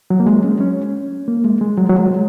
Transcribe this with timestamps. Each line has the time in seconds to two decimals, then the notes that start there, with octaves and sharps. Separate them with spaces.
0.10 F#3
0.20 A#3
0.27 G#3
0.44 C#4
0.61 C#4
1.28 A#3
1.44 G#3
1.61 G#3
1.78 F#3
1.89 F#3
1.95 G#3